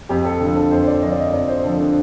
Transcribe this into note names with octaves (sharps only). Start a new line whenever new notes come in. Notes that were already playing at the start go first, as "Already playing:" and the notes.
F2 G4
A4
D3 F3
A4
F2 C5
D5
D3 F3 D#5
D5
D#5
F2 D5
C5
D3 F3 A4
D4